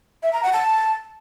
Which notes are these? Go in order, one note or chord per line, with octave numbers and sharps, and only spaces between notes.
E5
A#5
F#5
A5